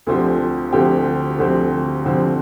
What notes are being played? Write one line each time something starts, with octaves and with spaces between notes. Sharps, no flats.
D2 D3 F3 C4 G4
D2 D3 F3 C4 G4
D2 D3 F3 C4 G4
D2 D3 F3 C4 G4